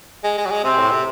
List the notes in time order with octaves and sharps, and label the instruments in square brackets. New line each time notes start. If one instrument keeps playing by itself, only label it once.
[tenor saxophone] G#3
G#3
F#3
G#3
[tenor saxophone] C3 [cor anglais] C4
[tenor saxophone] A2
C3